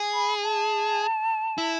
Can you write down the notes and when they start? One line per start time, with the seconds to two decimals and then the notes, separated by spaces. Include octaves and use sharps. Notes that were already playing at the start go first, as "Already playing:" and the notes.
Already playing: G#4
0.14 B5
0.43 A5
1.58 E4